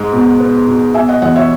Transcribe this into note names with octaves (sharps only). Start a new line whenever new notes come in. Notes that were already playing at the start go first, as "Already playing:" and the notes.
Already playing: G#2 G#3
B2
B3
B2
B2 E5 G#5
D#5 F#5
E2 D#5 F#5
C#5 E5